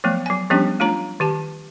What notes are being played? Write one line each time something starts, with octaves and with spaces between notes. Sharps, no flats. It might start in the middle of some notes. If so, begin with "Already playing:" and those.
F3 F#3 A3 B3
F#3 G#5
F3 G3 B3 C#4 D4 G4
A3 D4 F4 C#5 A#5
D#3 G4 A5